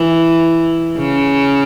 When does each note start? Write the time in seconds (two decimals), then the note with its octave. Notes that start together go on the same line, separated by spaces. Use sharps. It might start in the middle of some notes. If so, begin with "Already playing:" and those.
Already playing: E3
0.98 C#3